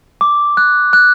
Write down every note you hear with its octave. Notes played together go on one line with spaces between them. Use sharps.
D6
F#6
F#6